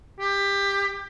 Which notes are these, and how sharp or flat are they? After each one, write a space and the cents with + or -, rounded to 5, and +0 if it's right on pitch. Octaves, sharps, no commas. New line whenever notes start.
G4 +20